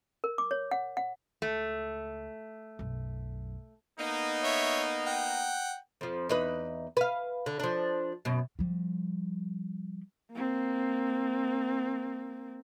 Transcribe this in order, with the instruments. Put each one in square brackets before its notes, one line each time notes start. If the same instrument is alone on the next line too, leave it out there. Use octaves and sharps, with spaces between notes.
[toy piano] A#4
D6
C#5
F#5
F#5
[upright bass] C#2 [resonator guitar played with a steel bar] A3
[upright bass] B1 F#2
[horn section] A#3 B3 D#4
[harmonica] C#5 E5
F#5 G5
[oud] F2 F3
E2 D#4 B4
B4 F5
D3
F3 D4
F#2 B2
[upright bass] F3 G3
[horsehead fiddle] A#3 C4